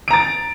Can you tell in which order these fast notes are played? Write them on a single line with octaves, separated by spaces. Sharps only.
D7 A#5 A6